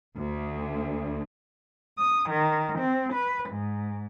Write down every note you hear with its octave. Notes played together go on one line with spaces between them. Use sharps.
D2
D#6
D#3
C4
B4
G#2